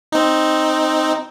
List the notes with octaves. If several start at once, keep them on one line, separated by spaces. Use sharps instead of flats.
C4 D#4